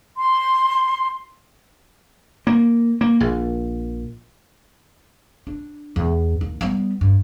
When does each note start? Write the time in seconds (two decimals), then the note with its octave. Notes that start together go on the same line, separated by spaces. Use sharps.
0.17 C6
2.47 A#3
3.01 A#3
3.20 A#1
5.47 D4
5.96 E2
6.41 D#2
6.61 G3 B3
7.01 G2